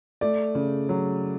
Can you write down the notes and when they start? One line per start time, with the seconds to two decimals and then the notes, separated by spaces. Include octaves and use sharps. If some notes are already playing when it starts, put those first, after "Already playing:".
0.21 A3 D5
0.55 C#3
0.89 F#3